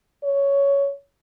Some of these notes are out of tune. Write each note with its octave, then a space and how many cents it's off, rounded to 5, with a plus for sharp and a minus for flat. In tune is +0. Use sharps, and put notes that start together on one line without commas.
C#5 +10